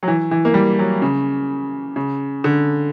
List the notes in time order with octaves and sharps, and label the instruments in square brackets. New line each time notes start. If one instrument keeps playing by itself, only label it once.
[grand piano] F#3
E3
E3
A#3
G3
F#3
C#3
C#3
D3